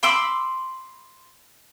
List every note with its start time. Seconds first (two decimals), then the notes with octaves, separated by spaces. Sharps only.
0.03 B5 C6 D6 E6